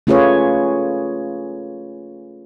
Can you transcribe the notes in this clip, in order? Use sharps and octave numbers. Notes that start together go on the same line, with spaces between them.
A3 C#4 F4 G#4 B4 C#5